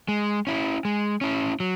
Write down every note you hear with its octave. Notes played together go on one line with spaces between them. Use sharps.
G#3
C#4 E4
G#3
C#4 E4
F#3